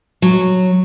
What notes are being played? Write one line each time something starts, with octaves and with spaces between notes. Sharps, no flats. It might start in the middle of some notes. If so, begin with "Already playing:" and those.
F#3